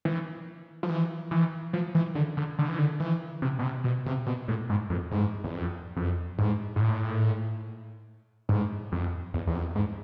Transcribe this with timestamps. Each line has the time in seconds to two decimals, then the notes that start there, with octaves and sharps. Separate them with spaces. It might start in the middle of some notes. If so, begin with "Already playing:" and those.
0.05 E3
0.83 F3
0.89 E3
1.31 E3
1.73 F3
1.95 E3
2.15 D3
2.37 D3
2.59 D3
2.68 E3
2.79 D3
3.00 E3
3.42 C3
3.59 B2
3.64 C3
3.84 B2
4.06 C3
4.26 B2
4.48 A2
4.69 G#2
4.90 F2
5.11 G#2
5.44 E2
5.54 F2
5.96 F2
6.38 G#2
6.76 G#2
6.80 A2
8.49 G#2
8.92 F2
9.34 E2
9.47 E2
9.55 F2
9.75 G#2